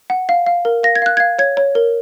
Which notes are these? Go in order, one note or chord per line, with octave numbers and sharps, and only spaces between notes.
F#5
F5
F5
A#4
F5 A#6
G#6
F5 F#6
G#6
F5
C#5 G#6
C#5
A#4